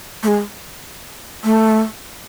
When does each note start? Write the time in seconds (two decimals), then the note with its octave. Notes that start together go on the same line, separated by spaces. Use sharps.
0.23 A3
0.28 G#3
1.44 A3